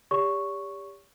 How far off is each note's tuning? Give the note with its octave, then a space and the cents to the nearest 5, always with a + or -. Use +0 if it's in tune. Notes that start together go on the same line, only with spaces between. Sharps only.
G4 +25 C#5 +45 C#6 +0